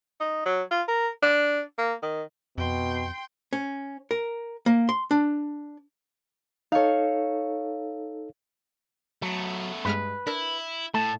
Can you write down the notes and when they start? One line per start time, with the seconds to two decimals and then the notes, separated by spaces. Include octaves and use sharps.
0.20 D#4
0.46 F#3
0.71 F4
0.88 A#4
1.23 D4
1.78 A#3
2.02 D#3
2.58 F2 B2 G5 C6
3.53 C#4
4.11 A#4
4.66 A#3
4.89 C6
5.11 D4
6.72 D#4 A4 C#5 F5
9.22 F#3 A3 B3
9.85 G2 G#3 B4 F6
10.27 D4 E4 A#4 B6
10.94 A2 A3 A5